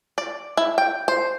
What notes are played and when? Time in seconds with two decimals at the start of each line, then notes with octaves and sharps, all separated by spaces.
0.18 D5
0.57 E4
0.78 G5
1.08 C5